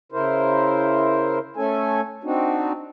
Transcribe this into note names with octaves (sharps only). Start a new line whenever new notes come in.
C#3 E4 A#4 C5
A3 C#4 A4 G#5
C4 D4 D#4 F#4